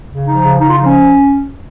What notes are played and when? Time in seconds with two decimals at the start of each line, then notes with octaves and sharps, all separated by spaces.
0.09 C#3
0.26 F3 D#4
0.43 C#3
0.60 C#3 D#4
0.70 F4
0.77 F3 D#4
0.86 C#4